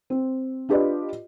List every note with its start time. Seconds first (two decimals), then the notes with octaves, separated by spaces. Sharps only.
0.10 C4
0.69 D4 F4 G4 B4 D5 D#5